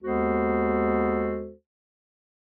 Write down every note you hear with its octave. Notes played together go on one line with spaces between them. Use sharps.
D#2 G#3 B3 F#4 A4 C5